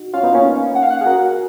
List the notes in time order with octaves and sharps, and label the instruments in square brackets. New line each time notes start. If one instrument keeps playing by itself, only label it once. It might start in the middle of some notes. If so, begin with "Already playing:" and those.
Already playing: [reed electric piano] D#4 F#4
[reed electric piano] C#4 F4 [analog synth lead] F5
[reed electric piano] B3 D#4
A#3 C#4
[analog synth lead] F#5
F5
F#5
[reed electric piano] G#4
F#4 A#4